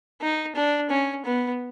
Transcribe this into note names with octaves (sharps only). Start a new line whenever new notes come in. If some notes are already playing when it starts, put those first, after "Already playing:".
D#4
D4
C#4
B3